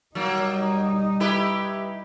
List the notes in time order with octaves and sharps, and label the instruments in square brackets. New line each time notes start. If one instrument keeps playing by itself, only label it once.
[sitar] F#3 A#3 [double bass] G3 D#4
[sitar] E4 G4 B4